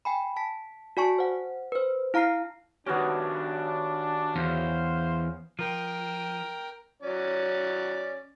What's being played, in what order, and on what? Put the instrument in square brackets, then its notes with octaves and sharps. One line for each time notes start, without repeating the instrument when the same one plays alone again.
[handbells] G5 G#5 B5
A5 B6
F#4 D5 G#5 A5 C#6
C5 F#5
B4 C5
E4 F5 A#5 F6 C7
[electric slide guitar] D#3 F#4 G4 [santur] B3 C#4 [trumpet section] D4
[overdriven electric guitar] E2 [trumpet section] C5 F5
[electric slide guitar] F3 [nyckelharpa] A#4 G5
[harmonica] F#3 C#4 D5